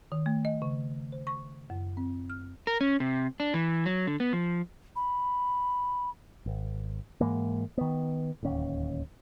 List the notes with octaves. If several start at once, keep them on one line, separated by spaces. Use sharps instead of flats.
D#3
A3
D#5
C#3
C5
C#6
F#2
C4
F6
A#4
C#4
C3
D4
E3
F#3
D3
B3
F3
B5
G#1
G#2 E3 G#3 A#3
D#3 B3
D1 D#2 C#4